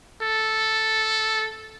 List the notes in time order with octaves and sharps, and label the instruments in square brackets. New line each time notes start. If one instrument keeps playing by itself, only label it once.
[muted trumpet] A4